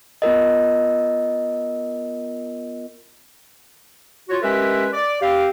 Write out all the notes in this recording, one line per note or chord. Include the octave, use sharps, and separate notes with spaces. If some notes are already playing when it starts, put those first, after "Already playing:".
B3 F4 A#4 D#5
F4 F#4 C#5
G#3 C#4 G4 A#4 B4 E5
D5
C4 G4 F5